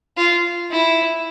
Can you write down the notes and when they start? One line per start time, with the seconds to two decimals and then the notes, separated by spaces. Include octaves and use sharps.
0.17 F4
0.71 E4